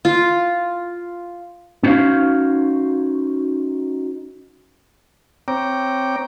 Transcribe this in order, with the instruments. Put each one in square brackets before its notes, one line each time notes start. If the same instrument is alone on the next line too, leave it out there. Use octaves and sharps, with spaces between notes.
[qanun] F4
[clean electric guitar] C#4 D#4 F#4 C5 C#5 F5
[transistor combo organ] C4 C#5 G5 A#5 D6